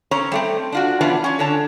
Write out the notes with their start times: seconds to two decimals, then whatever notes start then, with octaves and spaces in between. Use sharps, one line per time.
0.11 C4 C#4 C#5 A#5
0.32 G3 A3 C4
0.72 D4 F4 F#4
1.01 E3 G3 B3 C#4 D4 F4
1.24 C#4 C#5
1.39 D3 C#5 A5